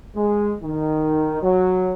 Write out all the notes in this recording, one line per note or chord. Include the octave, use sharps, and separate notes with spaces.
G#3
D#3
F#3